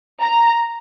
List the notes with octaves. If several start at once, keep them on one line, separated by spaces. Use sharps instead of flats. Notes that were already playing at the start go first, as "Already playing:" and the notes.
A#5